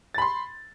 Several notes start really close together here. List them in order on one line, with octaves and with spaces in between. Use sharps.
A6 B5 C6